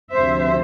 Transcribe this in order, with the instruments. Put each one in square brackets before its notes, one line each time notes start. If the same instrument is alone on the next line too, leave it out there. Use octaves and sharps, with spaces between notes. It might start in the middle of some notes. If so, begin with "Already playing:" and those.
[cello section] D2 C3 F3 C5 E5